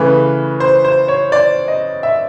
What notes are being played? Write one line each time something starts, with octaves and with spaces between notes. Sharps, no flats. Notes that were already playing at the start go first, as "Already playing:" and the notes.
Already playing: C#3 E3 A3 B4
C5
C5
C#5
D5
D#5
E5